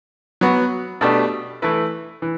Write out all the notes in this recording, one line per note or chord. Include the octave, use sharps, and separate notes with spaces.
F#3 B3 F#4
B2 A3 D4 G4
E3 A3 E4 B4
E3